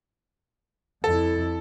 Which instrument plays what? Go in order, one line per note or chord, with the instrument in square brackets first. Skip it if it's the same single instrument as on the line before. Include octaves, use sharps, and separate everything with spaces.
[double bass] F2 E4 [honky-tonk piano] A4